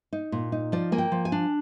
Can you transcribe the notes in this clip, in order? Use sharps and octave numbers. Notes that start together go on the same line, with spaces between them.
D#4
A#2
D#4
F3 D5
A#3 G#5
G5
F3
G#5
D4